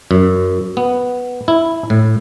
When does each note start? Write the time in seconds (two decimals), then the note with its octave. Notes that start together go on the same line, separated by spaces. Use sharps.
0.11 F#2
0.77 B3
1.48 E4
1.90 A2